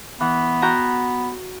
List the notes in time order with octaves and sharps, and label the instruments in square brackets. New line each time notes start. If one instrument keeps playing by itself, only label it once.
[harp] E3 [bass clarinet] B3
[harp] F#4 G5 A#5